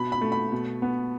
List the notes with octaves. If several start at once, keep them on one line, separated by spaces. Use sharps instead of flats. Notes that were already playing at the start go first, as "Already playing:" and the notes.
Already playing: B2 B5
B5
A3
B5
B2
B3